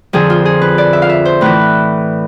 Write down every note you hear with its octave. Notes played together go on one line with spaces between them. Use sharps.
F2 D3 F3 G#4
F4
G#4
B4
D5
E5
F5
E5
C5
A2 E3 B4